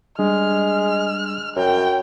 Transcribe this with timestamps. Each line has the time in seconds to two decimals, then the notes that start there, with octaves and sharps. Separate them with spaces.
0.19 G3 G#3 D4 F6
1.56 F#2 G5